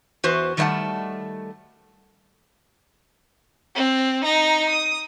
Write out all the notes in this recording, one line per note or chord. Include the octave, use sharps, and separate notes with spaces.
E2 F#4 B4 C5
D#3 G3 A3 C5 F#5 A5
C4
D#4 A#5
D#6